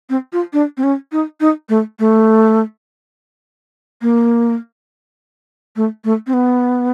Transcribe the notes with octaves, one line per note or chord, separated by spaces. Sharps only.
C4
F4
D4
C4
C#4
D#4
D#4
A3
A3
A#3
A3
A3
C4
B3